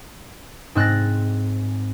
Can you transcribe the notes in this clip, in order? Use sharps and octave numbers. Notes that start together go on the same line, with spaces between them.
G#2 C4 F#6 A6 A#6